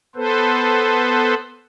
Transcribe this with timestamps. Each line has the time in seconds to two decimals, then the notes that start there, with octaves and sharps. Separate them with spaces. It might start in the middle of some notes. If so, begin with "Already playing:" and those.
0.16 B3 A4 B4 C5